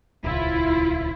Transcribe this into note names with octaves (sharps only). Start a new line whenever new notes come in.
D#1 C#2 E4 F4